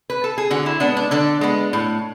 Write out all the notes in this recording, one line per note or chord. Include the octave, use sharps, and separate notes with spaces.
B4
A4
G#4
D3 F#4
E4
G#3 B3 D4
D4
D3 D4
G#3 B3
A2